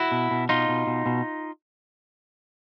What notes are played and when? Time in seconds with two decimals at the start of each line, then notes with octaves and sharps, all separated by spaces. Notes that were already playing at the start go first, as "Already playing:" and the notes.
Already playing: E4 F#4
0.12 B2
0.31 B2
0.49 B2 D#4 F4
0.69 B2
0.87 B2
1.06 B2